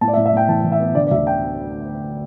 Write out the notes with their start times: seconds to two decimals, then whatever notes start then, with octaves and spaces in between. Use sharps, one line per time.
0.01 A2 A5
0.08 D5
0.13 E5
0.17 A2
0.26 E5
0.33 A2 G5
0.49 E3 A5
0.64 E3
0.72 E5
0.80 B3
0.95 D3 D5
1.07 D5
1.11 D2 E5
1.27 G5